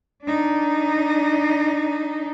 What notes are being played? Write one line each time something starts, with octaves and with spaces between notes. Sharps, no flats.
D4 D#4